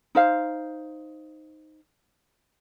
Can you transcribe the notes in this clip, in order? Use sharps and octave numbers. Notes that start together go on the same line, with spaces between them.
D#4 C5 F5